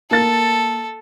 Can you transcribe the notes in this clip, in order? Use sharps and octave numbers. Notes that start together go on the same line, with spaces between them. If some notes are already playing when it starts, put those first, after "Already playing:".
A#3 A4 A6